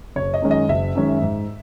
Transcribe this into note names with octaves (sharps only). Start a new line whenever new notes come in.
F#1 C#5
D#5
F#2 D#3 G#3 C#4
D#5
F#1 E5
F#2 D#3 G#3 C#4
G#2